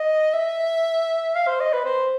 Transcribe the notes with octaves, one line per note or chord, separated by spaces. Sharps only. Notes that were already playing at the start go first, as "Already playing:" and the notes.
Already playing: D#5
E5
F5
C5
D#5
B4
C5